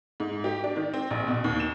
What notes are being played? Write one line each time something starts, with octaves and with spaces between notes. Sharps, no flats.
G#2
G4
D4
D#3
C4
A#1
B2
D#2
E7